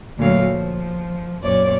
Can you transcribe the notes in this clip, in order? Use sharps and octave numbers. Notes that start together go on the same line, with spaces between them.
D2 A#2 F#3 A3 C#5 F5
F3
F#2 A#2 C#5 D5